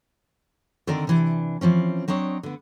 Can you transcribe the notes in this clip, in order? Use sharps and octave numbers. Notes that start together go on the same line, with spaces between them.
D3 D#3 C4 D4 A#4 D5
C3 E3 D4
E3 F3 C4 C#4
F#3 C4 D4 C#5 D#5
D3 B3